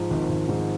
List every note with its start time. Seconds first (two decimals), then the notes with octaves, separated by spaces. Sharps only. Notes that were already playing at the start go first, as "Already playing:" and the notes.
Already playing: G#2 F3
0.10 G#1
0.29 G#1
0.49 G#2